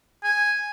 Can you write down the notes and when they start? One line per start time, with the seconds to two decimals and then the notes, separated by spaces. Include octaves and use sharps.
0.24 G#5